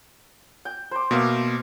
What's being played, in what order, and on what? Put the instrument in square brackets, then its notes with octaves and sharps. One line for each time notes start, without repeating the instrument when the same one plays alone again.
[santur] G5
C5 D6
[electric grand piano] B2 A#3 [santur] E5 F5 D6